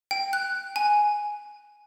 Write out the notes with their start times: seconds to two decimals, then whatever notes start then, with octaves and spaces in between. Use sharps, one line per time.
0.11 G5
0.33 F#6
0.76 G#5